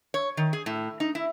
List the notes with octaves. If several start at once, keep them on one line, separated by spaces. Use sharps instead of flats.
C#5
D#3
G#4
A2
D#4
E4